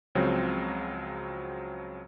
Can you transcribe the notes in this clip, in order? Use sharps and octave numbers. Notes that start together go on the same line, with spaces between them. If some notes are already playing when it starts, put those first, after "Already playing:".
C#2 C#3 F3 F#3 C4